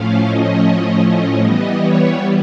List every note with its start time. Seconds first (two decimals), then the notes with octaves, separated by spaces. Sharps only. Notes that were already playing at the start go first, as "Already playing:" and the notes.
Already playing: A2 F3 A3 C#4 F5
0.27 D#5
1.04 D#5
1.43 E3 G3 B3 D#5
1.81 C#5